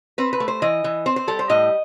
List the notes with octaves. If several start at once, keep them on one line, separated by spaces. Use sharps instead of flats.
C4 B4
B4
A3
C5
E3 D#5
E3
C4 C5
C5
G3 A4
C5
A2 D#5